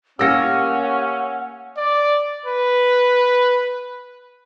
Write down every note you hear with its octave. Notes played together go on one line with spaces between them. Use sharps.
A#3 C#4 G4 F#5 E6 A#6 C#7
D5
B4